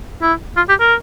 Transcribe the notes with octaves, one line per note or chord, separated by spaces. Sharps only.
E4
F4
G4
A#4